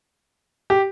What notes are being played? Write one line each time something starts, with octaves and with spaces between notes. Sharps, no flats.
G4